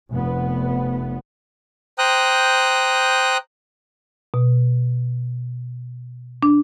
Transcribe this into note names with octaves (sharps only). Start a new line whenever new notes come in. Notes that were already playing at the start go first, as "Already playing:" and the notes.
F1 B3
C5 G5 A#5 D#6 F#6
B2
D4